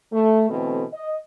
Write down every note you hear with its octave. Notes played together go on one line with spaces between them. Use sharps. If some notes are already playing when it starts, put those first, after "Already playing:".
A3
B2 D3 E3 A3 C4
D#5